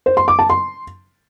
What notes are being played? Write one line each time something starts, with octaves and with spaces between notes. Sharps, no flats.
C5
C6
D6
A5
C6